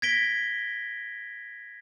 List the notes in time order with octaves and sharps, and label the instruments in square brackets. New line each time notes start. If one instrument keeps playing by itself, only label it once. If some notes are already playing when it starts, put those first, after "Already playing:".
[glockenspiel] G#6 A#6 B6 D7 G7